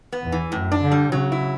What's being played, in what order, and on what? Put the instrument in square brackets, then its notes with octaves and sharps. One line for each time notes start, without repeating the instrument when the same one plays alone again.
[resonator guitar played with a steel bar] B3
[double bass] E2
[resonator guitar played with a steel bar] E3
[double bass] F#2 [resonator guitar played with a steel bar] A2
[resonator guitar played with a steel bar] D4
[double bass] D3
[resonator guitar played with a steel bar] G3
[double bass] C#3 [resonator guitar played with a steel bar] F#3
[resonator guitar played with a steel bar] E4